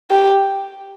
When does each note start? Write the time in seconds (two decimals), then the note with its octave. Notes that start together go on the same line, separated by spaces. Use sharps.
0.11 G4